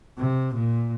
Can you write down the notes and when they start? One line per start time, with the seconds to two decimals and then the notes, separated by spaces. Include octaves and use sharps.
0.18 C3
0.54 A#2